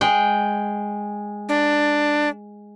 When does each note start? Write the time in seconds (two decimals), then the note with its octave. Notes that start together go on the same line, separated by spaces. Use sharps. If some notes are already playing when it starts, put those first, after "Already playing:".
0.01 G#3 G5
1.49 D4